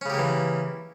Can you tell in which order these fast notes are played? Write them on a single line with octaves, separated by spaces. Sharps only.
C#4 C#3 G4 A#3 E3